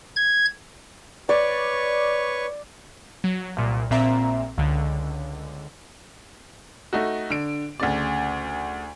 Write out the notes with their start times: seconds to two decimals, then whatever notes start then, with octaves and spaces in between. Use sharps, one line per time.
0.16 G#6
1.29 B4 C#5 D5 C#6
3.24 F#3
3.56 C2 A#2
3.90 A#1 A#2 C4 E5 A#5
4.58 C#2 D3
6.93 A3 D#4 F#4
7.30 D3 D7
7.80 D2 C#3 D5